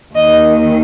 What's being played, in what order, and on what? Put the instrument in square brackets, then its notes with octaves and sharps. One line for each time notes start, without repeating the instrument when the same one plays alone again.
[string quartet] D#2 D#3 D#5